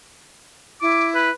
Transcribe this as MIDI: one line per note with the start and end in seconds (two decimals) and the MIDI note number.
0.82 1.30 64
0.82 1.08 86
1.15 1.31 71